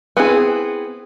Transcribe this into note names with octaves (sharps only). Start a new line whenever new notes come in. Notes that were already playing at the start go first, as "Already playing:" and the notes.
B3 C4 E4 G#4